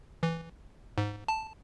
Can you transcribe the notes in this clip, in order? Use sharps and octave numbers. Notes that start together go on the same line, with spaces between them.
E3
G#2
A5